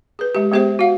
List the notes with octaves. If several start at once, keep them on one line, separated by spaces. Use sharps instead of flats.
G#4 B4
G#3 G4
G#3 B3 G4 G#4 C5 E5
F#4 F5 F#5